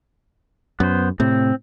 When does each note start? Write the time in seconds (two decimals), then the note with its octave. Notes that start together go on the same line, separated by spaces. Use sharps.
0.80 F#2 B3 C5
1.20 A2 C3 C4